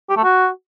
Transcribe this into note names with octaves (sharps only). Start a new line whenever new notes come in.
G4
A3
F#4